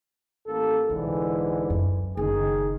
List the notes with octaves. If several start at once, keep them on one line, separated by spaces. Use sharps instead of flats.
A1 A#3 A4
C2 G#2 D3 E3
F#2
F#1 D#3 G#4